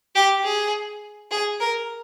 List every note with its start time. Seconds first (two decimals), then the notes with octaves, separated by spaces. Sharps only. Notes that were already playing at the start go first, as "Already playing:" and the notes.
0.15 G4
0.44 G#4
1.31 G#4
1.60 A#4